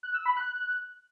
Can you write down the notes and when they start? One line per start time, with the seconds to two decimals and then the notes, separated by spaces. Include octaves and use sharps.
0.03 F#6
0.14 E6
0.26 B5
0.37 F#6